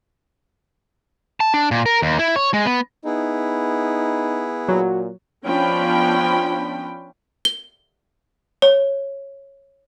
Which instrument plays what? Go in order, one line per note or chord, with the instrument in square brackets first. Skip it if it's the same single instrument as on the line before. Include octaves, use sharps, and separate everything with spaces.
[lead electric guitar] A5
D4
A#2
A#4
D#2
E4
C#5
G#3
B3
[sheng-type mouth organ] B3 E4 G#4 [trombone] D#4
[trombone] A#2 [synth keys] F#3
[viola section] F3 B3 C#4 D4 G5 B5
[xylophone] G7
C#5